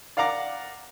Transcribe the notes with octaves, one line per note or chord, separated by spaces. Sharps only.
D5 F5 F#5 A#5 D6